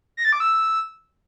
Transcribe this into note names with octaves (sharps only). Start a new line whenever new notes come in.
A#6
A6
D6
E6